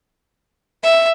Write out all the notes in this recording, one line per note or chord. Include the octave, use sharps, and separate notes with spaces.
E5